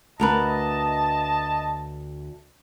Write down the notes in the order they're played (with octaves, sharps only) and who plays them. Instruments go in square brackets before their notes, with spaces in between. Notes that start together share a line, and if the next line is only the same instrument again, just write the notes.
[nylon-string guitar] D2 A#4 B4 [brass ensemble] D#5 A5